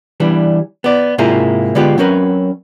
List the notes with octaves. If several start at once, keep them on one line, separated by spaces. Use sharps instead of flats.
E3 G3 B3 D4
B3 D5
G#2 C3 A#3 E4 F4 G#4
D3 G#3 B3 F4 G4
F#3 C4 C#4 A#4 B4